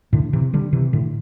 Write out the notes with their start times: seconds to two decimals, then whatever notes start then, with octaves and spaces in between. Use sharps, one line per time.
0.13 A2 D3
0.33 C3 E3
0.53 D3 G3
0.73 C3 E3
0.93 A2 D3